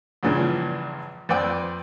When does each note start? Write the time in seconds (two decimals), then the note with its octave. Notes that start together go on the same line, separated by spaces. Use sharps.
0.23 A#1 G2 A#2 C#3 E3 F3
1.29 F2 B4 C5 D5 G5 E6